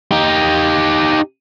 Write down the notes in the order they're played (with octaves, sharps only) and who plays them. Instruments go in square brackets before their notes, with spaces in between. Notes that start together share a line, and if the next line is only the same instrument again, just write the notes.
[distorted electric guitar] D#4 G4